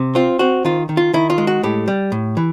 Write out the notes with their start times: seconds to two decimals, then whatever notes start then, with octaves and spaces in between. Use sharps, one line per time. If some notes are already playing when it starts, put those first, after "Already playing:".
Already playing: C3
0.15 C4 F4
0.39 C4 F#4
0.65 D#3 F4
0.89 D#3
0.97 F4
1.14 D#3 E4
1.30 F4
1.38 G#3
1.47 F#4
1.63 A2 G4
1.88 G3
2.12 A2
2.37 E3